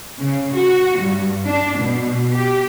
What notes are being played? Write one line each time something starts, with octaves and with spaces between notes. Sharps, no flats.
C#3
F#4
G2
D4
B2
G4